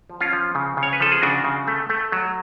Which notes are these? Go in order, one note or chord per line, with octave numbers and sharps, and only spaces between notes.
F3
C#4 F4
F3
C#3
C#3
C#5
B4
F3 A4
G#4
C#3 D4 F#4
C#3
A3
A3
F#3